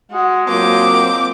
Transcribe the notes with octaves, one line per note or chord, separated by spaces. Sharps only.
G#3 F#4
F#3 A#3 C4 F4 D6